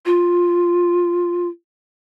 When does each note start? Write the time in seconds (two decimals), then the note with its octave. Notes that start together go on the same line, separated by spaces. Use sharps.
0.06 F4